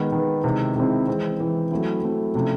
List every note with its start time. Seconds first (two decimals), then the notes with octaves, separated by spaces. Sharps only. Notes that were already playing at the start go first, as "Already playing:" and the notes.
Already playing: D#3 G#3 B3
0.12 D#3 G#3 B3
0.44 C3 D#3 G#3 C4 E4
0.76 C3 D#3 G#3 C4 E4
1.08 E3 G#3 C4
1.40 E3 G#3 C4
1.71 F#3 A3 C4 E4
2.03 F#3 A3 C4 E4
2.35 C3 F3 A3 C#4 E4